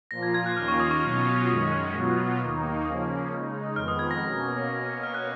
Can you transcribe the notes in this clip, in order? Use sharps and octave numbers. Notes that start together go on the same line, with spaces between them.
A#2 F3 A#3 F4 A#6
G#6
G#6
F#6
D#2 D#3 A#3 C#4 F4 F6
C#6
D#6
C#6
B2 F#3 C#4 F4
F#2 D#3 G#3 C#4 D#6
B2 F#3 B3 F4
D#2 D#3 A#3 D#4
C#3 F3 A#3 C#4 D#6
C#3 G#3 D#4
F2 D#3 G#3 B3 F6
D#6
G#6
A#6
B2 A#3 C#4
B2 A#3 C#4
F6
F#6